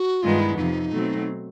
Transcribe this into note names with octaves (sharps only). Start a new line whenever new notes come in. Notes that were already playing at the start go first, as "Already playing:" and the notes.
Already playing: F#4
G2 D#3 G#3 B3 F4
E4
F2 C3 F3 D#4
B2 F#3 A3 C4